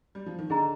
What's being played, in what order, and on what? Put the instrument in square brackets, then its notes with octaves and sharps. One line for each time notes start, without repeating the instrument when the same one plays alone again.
[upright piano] G3
F3
D#3
[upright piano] D3 [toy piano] D4 G#4 D#5 A#5